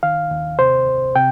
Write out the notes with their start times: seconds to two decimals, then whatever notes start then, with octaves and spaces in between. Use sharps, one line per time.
0.03 D#3 F5
0.31 D#2
0.59 C3 C5
0.87 C2
1.15 C3 G5